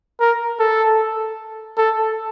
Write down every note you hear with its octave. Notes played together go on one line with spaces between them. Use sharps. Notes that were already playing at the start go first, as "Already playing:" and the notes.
A#4
A4
A4